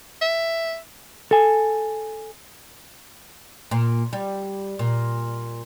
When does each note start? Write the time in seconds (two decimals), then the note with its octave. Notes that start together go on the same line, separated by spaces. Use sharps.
0.22 E5
1.31 A4 G#5
3.71 A#2
4.13 G3
4.79 A#2